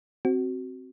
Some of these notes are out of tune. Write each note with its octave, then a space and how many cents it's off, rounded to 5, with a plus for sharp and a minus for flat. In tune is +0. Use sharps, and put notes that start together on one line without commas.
C4 +0 F#4 +15